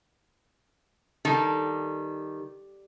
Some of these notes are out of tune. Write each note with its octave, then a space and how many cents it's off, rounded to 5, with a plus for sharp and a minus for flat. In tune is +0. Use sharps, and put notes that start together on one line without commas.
D#3 +0 G3 +0 A4 -10